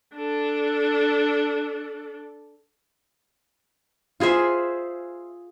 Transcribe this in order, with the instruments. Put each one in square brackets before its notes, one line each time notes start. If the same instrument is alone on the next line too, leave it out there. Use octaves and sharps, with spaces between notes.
[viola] D4 A4
[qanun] F4 G#4 C5 E5